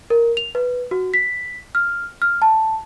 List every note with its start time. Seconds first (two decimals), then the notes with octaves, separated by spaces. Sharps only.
0.10 A#4
0.37 F7
0.55 B4
0.91 F#4
1.14 B6
1.75 F6
2.22 F6
2.42 A5